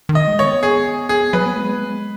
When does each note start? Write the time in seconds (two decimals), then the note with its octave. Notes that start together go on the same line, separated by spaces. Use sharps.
0.09 D#3
0.15 D#5
0.27 G#3
0.39 C#5
0.45 B3
0.63 G#4
1.09 G#4
1.33 F#3 B4
1.46 B3
1.57 G#3
1.73 B3
1.80 G#3